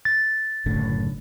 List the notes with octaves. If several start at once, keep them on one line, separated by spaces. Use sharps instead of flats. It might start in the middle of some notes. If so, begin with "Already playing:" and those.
A6
F#1 A2 D3